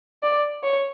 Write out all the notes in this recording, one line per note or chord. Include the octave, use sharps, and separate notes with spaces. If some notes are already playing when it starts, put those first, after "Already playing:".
D5
C#5